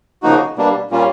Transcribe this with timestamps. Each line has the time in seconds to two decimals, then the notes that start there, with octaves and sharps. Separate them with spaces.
0.23 C#3 F3 A#3 D#4 F#4
0.57 B2 G3 A#3 D4
0.91 A#2 G3 A#3 C#4 F4